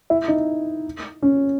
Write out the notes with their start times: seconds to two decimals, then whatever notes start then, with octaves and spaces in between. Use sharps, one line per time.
0.10 E4
0.28 D#4
1.22 C#4